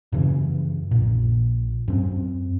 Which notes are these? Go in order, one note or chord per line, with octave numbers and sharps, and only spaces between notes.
F#2 C#3 E3
A#1 A#2
F#2 C4